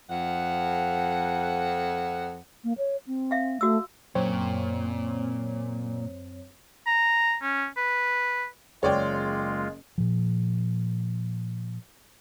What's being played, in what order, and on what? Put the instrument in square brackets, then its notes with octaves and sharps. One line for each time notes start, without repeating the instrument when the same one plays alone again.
[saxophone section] F2 F#5
[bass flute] A#3
C#5
C4
[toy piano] E5 F5
[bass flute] A3 [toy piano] F#4 E6
[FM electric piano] F#2 C4 C#5 [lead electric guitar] A#2
[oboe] A#5
C#4
B4
[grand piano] F#1 [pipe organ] G#3 F4 [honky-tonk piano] C#5 D5 G5
[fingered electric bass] A#2 F3